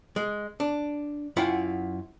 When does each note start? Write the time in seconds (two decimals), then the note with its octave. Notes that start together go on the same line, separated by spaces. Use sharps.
0.16 G#3
0.60 D4
1.37 F#2 E4 F4 F#5 G5 B5